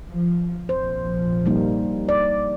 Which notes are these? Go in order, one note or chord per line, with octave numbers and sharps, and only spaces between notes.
F3
F1 A#1 F3 C5
G3 A#3 D#4
D5